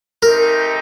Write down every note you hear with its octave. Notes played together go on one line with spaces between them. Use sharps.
A3 C4 D#4 G4 A#4